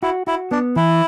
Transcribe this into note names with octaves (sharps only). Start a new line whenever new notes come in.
E4 F#4
E4 F#4
B3 D4
E3 E4